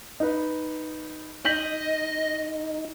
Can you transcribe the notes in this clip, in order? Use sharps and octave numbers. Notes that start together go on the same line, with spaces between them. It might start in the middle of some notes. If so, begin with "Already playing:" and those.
D#4 B4
D#4 D#5 G6 B6 F#7